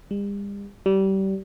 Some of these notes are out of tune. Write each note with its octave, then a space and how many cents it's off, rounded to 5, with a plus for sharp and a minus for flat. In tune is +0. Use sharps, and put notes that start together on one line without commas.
G3 +45
G3 -25